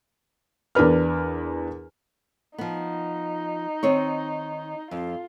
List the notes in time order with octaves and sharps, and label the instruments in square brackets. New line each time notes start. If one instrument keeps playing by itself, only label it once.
[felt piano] E2 D4 A#4 B4 F6
[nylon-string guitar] F3 B3 [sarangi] D#4
[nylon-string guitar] D#3 C4 C#5
[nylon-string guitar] F2 [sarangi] F4